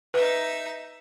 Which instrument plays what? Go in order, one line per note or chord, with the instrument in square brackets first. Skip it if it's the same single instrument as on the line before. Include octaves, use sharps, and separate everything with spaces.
[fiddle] D#4 E5 [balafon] B4